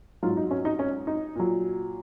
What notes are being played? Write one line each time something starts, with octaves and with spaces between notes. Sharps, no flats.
G#2 F#3 F4
D#4
C#4
D#4
C#4
D#4
A#2 F#3